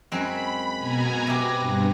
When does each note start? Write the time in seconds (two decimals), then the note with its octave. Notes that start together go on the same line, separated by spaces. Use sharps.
0.12 F#2 G#3 C4 B5
0.78 B2 G#5 A#5
1.27 C3 G4 B4 A#6
1.57 G2